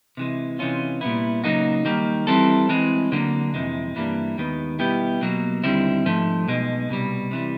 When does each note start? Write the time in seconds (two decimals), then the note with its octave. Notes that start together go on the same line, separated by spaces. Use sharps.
0.17 C3 E3 G#3
0.59 C3 E3 G#3 C#4 F4
1.01 A#2 G3 B3 E4
1.44 C#3 F#3 A#3 D#4 F#4
1.85 D#3 G3 A#3
2.27 E3 G3 C4 E4 A4
2.69 E3 G#3 C4
3.11 D2 D3 F#3 A#3
3.54 F2 C3 E3 G#3
3.96 G2 E3 G3 A#3 D4
4.37 D#2 D#3 G#3 B3
4.79 B2 G3 B3 E4 G4
5.21 B2 F#3 A#3
5.63 D#2 D3 G3 C4 E4
6.05 G#2 F3 A3
6.47 B1 B2 G#3
6.89 C2 B2 G3
7.31 C3 E3 G3